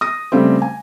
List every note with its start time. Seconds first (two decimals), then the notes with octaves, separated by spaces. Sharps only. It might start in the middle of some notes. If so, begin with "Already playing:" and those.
0.01 D#6 A#6
0.32 C#3 G3 A3 C4
0.62 G#5